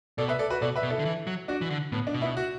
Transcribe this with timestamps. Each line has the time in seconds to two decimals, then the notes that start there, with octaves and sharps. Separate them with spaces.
0.18 B2 A4 D5
0.28 B4 E5
0.39 A4 D5
0.50 F#4 B4
0.61 B2 A4 D5
0.76 B4 E5
0.83 B2
0.90 E4 A4
0.99 D3
1.05 E3
1.27 F#3
1.48 D4 F#4
1.61 E3
1.70 D3
1.92 A2 B3
2.07 D4
2.14 B2
2.21 B3 E4
2.37 F#4